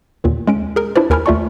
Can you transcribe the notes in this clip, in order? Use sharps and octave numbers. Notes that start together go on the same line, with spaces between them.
D#2 A#2 D3 D#3
G#3 C#4 D7
G#4 A#4
D4 E4 F4 B4 C5 D5
D#2 A#4 G#5 A5 B5 F6
D#2 A3 F4 D5 A5 C#6